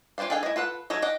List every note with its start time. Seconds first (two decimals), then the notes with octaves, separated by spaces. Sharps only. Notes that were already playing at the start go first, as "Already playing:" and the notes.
0.18 F4 G4 C5 D5 F5
0.30 D4 G#4 A4 F5 G5
0.43 E4 D#5
0.56 F4 A4 B4 F#5
0.90 F#3 A4 C#5 D#5
1.02 G4 D#5 F#5